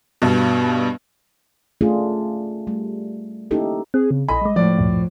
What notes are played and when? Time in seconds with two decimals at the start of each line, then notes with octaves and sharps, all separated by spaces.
0.22 G2 B2
1.81 A3 C#4 D4 F4 G#4
2.67 G3 A3
3.51 A#3 C#4 D#4 E4 G4 A4
3.94 C4 G#4
4.11 C#3
4.29 A#1 A4 D#5 G#5 B5
4.41 G3 G#3
4.56 A2 F3 D5
4.78 D2 G2 A#2